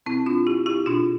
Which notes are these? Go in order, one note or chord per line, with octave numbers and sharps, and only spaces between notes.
B2 C4 E4
D4 F4
E4 G4
E4 G4
B2 D4 F4